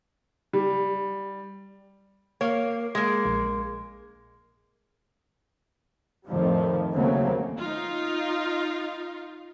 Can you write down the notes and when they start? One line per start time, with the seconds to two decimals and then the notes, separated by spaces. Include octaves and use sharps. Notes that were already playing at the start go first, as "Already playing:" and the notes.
0.53 G3
2.41 A#3 C#5 F5
2.95 G#3 A#3
3.25 A#1
6.26 F2 A2 D#3 F3 G3
6.93 D#2 C#3 F#3 A3 A#3 C4
7.56 D#4 F4